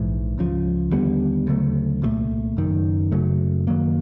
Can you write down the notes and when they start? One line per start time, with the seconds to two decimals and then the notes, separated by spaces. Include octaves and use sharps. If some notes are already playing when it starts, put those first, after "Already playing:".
Already playing: A#1 G#2 E3
0.38 C#2 C#3 F3
0.91 D#2 D3 G3 B3
1.47 D2 C#3 F#3 A3
2.02 C2 A#2 F3 A3
2.57 F#1 F#2 D#3
3.12 F#2 C#3 F#3 A3
3.67 F#2 D#3 F#3 A#3